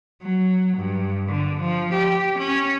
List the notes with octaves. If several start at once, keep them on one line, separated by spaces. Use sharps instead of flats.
F#3
G2
D3
F3
G4
C#4